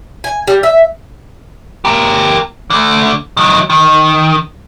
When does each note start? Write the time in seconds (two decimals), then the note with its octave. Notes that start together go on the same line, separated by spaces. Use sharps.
0.24 G#5
0.48 G3
0.63 E5
1.85 G4 A#4
2.70 D3 A3
3.37 D#3 F#3
3.70 D#3